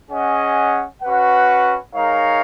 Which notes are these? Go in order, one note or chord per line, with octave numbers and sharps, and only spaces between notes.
C#4 G#4 D#5 F#5
C#4 F#4 B4 F#5
G#3 D#4 A#4 C#5 F5